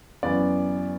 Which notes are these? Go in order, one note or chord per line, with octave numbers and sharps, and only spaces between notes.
F#2 E3 B3 D5